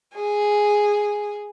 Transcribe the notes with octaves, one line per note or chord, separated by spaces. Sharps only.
G#4